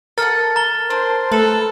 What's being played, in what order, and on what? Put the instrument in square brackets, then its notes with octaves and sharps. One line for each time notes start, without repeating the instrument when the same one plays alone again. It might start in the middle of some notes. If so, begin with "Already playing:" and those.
[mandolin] A4 D#5 F#5 [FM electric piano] A#4 [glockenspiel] F6 A6
[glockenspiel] A#5 A6 G7
[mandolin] D4 [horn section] C5
[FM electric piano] A3 [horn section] A4 [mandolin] B4